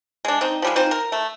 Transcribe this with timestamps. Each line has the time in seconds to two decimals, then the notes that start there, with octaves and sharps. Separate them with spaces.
0.25 G#3 D4
0.41 C4 D#4
0.62 F3 G3 G#3
0.76 C4 D#4 F4 C5
0.91 A#4
1.12 A3